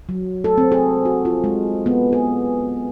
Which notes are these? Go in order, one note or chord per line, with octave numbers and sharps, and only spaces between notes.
F#3
A4
C4
G#4
F#4
F4
G#3
B3
G#4